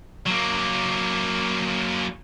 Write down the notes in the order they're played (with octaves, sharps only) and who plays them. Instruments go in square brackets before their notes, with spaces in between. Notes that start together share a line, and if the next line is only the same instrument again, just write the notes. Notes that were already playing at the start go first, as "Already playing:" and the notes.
[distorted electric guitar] F#3 A#3